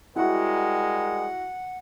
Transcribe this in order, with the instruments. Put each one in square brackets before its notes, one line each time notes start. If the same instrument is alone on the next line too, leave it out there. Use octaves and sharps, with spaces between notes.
[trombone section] G3 G#3 A#4 [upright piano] E4 F#4 [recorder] F#5